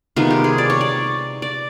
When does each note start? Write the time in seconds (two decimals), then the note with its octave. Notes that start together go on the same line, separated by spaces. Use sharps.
0.16 C3 D#3 G#3 B3 F4
0.31 G4
0.44 G#4
0.58 D5
0.70 C#5
0.81 D5
1.42 D5